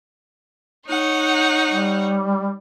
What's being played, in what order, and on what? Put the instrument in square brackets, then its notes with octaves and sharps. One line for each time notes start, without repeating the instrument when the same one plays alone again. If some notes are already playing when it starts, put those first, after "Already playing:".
[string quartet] D#4 C#5 F#5
[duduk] G3